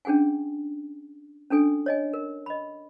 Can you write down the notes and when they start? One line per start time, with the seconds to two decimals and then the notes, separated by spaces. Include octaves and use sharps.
0.05 C#4 D4 G#4 F#5 G#5
1.50 C#4 D4 A4 G#5
1.86 C#5 D#5 G#5
2.14 A#4
2.46 D#5 B5